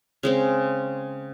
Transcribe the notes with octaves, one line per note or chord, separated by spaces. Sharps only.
C#3 G#3 C4